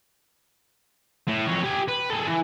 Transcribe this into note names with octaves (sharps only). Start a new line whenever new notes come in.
A2
F2 C#4
G4 G#5
B4
G#4 A4
E3